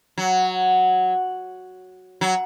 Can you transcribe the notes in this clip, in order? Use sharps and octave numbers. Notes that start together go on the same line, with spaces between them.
F#3
F#3